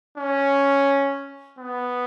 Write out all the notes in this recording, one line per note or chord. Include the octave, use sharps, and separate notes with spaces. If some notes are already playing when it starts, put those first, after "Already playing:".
C#4
B3